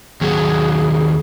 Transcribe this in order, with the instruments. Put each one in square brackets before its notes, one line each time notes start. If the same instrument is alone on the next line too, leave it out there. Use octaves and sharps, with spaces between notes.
[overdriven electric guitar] D#2 F#3 [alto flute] G#4